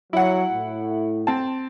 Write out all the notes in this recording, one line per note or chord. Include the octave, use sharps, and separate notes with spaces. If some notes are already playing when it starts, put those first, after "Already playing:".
F#3 E4 F#5
A2
C4 A5